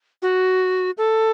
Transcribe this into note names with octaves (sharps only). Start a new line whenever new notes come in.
F#4
A4